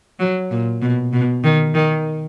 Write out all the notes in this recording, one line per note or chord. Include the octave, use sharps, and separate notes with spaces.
F#3
A#2
B2
B2
D#3
D#3